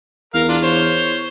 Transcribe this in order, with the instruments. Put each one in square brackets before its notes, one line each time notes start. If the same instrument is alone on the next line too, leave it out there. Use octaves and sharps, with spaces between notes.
[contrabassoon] E2 [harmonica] A#4 F5 F6
[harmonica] D4 F4
C5 C#5